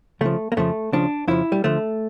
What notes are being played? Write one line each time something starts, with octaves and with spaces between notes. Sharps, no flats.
C#2 C#3 F3 A3
A#3
F2 C#3 F3 A3
C#2 C#3 F3 D4
F2 C#3 F3 E4
G3
D2 D3 F3 A3